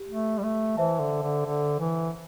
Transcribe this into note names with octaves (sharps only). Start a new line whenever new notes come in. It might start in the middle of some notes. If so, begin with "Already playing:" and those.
Already playing: G4
A3
G3
A3
E3 C5 E5 A5
D3
D3
D3
E3